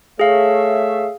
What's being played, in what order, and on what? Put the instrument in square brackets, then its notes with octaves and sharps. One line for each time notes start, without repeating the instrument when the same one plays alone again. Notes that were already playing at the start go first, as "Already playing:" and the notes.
[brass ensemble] A3 C#5 E5 [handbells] G#4 F5